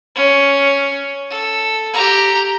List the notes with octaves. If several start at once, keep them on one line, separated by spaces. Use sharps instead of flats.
C#4
A4
G4 A#5